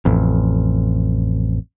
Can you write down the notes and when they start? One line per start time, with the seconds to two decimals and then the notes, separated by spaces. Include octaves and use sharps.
0.05 A1 F2